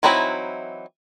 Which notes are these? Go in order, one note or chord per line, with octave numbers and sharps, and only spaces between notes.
E3 F#3 C4 D#4 E4